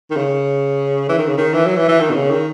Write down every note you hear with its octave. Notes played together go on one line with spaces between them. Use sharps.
D#3
C#3
E3
D#3
C#3
D#3
E3
F#3
E3
E3
D#3
B2
C#3
D#3